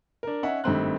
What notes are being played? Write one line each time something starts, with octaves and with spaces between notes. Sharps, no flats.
D4 A#4
C#4 D#4 C#5 E5 F#5
G#1 G2 A3 C4 C6 F#6